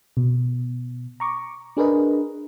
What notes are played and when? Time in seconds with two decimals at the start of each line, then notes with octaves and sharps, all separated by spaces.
0.17 B2
1.20 A#5 C#6 D6
1.77 D4 G#4 A#4 B4 D#5